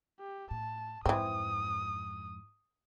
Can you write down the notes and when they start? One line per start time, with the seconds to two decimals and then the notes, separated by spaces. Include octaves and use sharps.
0.20 G4
0.51 A2 A5
1.06 F2 G#2 E3 C4 D#6